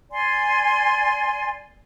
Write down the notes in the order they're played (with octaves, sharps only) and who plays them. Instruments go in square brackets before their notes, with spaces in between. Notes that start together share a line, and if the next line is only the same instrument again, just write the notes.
[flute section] D5 G#5 C6